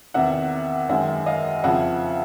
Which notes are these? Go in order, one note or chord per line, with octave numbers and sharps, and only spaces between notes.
E2 C3 D#3 E5 F#5
F#2 D#3 G#3 E5 F#5
D#5 F5
F2 C#3 F3 E5 F#5